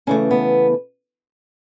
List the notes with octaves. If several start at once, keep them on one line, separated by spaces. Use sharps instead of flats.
C#3 E3 A3 C#4
B3